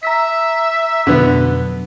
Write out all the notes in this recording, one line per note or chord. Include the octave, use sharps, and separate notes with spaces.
E5 A#5 E6 B6
F2 B2 D3 F#3 B3